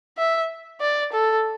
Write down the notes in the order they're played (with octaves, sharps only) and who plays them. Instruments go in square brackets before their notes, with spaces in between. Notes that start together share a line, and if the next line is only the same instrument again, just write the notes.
[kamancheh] E5
D5
A4